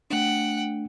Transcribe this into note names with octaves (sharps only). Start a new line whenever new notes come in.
A3 D4 F#5 G5